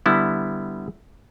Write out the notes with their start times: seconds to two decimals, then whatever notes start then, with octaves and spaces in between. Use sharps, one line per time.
0.06 D3 G3 B3 E4